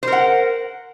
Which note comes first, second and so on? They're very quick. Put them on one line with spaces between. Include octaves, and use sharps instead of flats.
C5 A#4 F#5